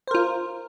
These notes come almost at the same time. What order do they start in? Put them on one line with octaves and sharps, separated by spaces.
C5 A#4 F4